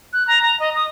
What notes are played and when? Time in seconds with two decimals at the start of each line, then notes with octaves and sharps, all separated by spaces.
0.13 F#6
0.27 A#5
0.43 A#5
0.60 D#5
0.75 D#6